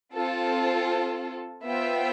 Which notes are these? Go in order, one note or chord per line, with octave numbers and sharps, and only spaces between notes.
C4 F4 A4
B3 F4 C5 E5 G5